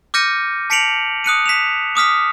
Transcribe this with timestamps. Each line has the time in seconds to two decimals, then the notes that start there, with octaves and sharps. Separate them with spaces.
0.14 D6 F6 G6 A#6 C#7 D#7
0.70 A5 B6 C#7 D7 F7 F#7
1.24 D#6 F#6 C#7 D#7
1.46 B6 E7 F7
1.95 D6 D#6 F6 B6